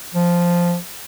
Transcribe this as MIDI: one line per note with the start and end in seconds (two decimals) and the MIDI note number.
0.15 0.77 53